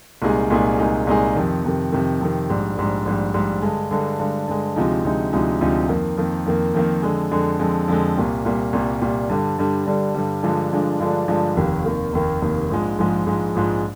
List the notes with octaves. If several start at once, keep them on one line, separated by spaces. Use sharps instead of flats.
C2 A#2 G#3 D#4 G#4
C2 A#2 G#3 D#4 G#4
C2 A#2 G#3 D#4 G#4
C2 A#2 G#3 D#4 G#4
F2 C3 D#3
F2 C3 D#3
F2 C3 D#3
F2 C3 D#3
A#1 G#2 G3
A#1 G#2 G3
A#1 G#2 G3
A#1 G#2 G3
G2 D3 G#3
G2 D3 G#3
G2 D3 G#3
G2 D3 G#3
D2 C3 F3 G#3 D#4
D2 C3 F3 G#3 D#4
D2 C3 F3 G#3 D#4
D2 C3 F3 G#3 D#4
F2 D#3 A#3
F2 D#3 A#3
F2 D#3 A#3
F2 D#3 A#3
F2 D3 G#3
F2 D3 G#3
F2 D3 G#3
F2 D3 G#3
C2 A#2 G3
C2 A#2 G3
C2 A#2 G3
C2 A#2 G3
G2 D3 G3
G2 D3 G3
G2 D3 G3
G2 D3 G3
G2 D3 F3 G#3 D4
G2 D3 F3 G#3 D4
G2 D3 F3 G#3 D4
G2 D3 F3 G#3 D4
F1 D#2 D#3 A#3
F1 D#2 D#3 A#3
F1 D#2 D#3 A#3
F1 D#2 D#3 A#3
A#1 G#2 F3 G#3
A#1 G#2 F3 G#3
A#1 G#2 F3 G#3
A#1 G#2 F3 G#3